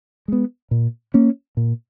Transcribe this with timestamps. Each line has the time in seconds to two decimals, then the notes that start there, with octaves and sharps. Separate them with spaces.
0.28 G#3 B3
0.71 A#2
1.14 A#3 C#4
1.57 A#2